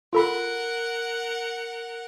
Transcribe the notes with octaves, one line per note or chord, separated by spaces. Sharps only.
F4 A4 A#4 F#5 B5